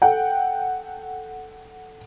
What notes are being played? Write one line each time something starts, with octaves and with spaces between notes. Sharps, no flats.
A4 F#5 G5